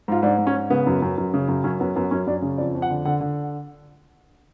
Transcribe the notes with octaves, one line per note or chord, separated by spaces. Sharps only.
G#2 F4
G#2 D4
G#2
C#4
G#2
C#3 B3
F#2
F#2
F#2
C#3
F#2
F#2 C#4
F#2 B3
F#2 B3
F#2 C#4
F#2 D4
C#3
F2 D5
F2
F#5
D3
D3 F#5
D3